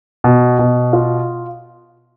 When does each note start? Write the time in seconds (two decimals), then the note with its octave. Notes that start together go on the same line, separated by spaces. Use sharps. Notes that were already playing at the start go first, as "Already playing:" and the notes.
0.24 B2
0.59 B2
0.93 F4